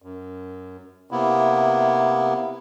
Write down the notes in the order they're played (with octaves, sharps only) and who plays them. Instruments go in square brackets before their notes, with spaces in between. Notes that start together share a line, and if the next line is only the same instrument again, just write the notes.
[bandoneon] F#2
C3 A#3 B3 E4